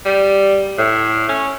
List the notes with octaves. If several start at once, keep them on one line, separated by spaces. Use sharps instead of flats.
G3
A2
C#4